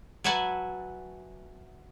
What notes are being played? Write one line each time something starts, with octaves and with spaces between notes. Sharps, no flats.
F#3 B4 E5 F#5 G#5 A5